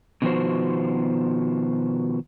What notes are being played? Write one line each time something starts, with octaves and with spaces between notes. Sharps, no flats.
B2 D#3 F3 B3 F#4 C5